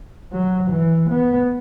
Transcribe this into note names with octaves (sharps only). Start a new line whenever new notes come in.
F#3
E3
B3